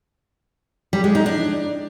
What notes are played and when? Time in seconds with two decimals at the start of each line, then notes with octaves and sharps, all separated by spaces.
0.93 G3
1.04 G#3
1.15 D#4
1.26 D4